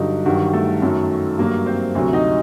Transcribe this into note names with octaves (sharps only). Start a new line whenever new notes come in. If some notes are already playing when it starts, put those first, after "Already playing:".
Already playing: G2 D3 F#3 D#4
G2 D#3 F#3 F#4
A3 A4
F#2 D#3 F#3
G2 F#3 A#3 A#4
C4 C5
D2 C3 F#3
D#4 D#5